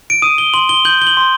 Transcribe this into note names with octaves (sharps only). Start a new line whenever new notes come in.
D7
D#6 D#7
G7
C6 F#7
G7
G6 F#7
G7
F#7
C6